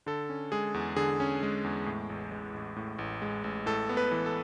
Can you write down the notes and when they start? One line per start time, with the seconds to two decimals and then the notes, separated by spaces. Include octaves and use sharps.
0.06 D3 A4
0.29 C#4
0.52 G#3 G#4
0.74 E2
0.96 D3 G#4
1.20 C#4
1.42 G#3
1.64 E2
1.86 A2
2.10 A1
2.32 G#3
2.54 A1
2.76 A2
2.99 A1
3.22 G#3
3.44 A1
3.66 A2 A4
3.89 B3
3.97 B4
4.12 E3
4.26 A4